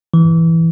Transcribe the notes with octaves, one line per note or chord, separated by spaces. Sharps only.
E3